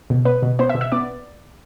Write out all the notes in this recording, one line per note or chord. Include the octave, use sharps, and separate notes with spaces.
B2
B3 B4
B2
B3 C5
E5
B2
E5
B3 D5